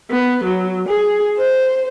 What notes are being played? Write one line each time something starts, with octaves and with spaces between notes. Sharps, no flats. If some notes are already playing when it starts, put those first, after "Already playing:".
B3
F#3
G#4
C5